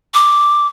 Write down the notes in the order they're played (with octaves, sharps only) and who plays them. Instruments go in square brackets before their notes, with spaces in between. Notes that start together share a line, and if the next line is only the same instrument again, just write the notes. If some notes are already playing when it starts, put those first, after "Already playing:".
[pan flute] D6